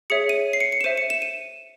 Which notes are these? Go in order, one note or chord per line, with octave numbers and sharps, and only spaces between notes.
G#4 C#5 E5 C#7
D#7
C7
C#7
C#7
E7
C5 E5 D#7
C#7
E7
D#7